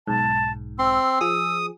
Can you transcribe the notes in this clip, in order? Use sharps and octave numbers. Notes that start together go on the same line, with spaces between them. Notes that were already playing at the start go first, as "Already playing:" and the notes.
B1 G#2 A5
C4 C6 E6
F3 G#4 D#6